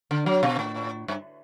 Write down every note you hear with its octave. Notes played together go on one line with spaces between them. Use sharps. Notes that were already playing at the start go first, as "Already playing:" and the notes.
D3
F#3
B2
A2
G2